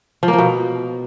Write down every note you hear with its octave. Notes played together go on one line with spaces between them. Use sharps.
F3
A#3
F3
B2